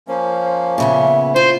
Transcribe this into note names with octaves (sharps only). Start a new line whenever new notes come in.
F3 A#3 C#4 C5
A#2 C#3 B3 E5
F4 C5